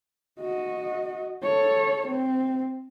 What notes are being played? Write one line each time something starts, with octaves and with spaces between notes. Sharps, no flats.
F#4 D#5
A4 C#5
C4